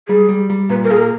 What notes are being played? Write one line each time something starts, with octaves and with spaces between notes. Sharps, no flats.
G3 G#4
G3
G3
A#2 B4
A#4
A#3 G#4
A#4